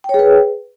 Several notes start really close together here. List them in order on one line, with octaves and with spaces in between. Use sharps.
G5 C#5 G#4 B4